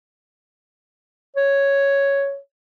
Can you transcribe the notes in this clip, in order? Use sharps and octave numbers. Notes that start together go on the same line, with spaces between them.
C#5